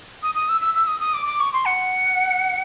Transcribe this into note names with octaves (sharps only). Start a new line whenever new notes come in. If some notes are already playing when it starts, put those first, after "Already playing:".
D#6
D#6
E6
E6
E6
D#6
D#6
D6
D6
C#6
C6
F#5